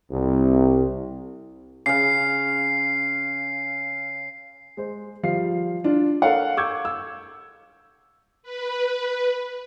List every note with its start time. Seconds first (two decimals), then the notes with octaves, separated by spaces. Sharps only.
0.11 C2
1.86 C#3 F5 C7
4.77 G#3 C5
5.23 F3 G3 F5 C7
5.84 D4 F4
6.22 A4 A#4 C#5 F5 F#5
6.57 C#6 D6 E6 G6 G#6
6.85 E6
8.43 B4